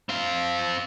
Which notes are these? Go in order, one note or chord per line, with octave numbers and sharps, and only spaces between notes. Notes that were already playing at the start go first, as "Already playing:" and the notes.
C4 F5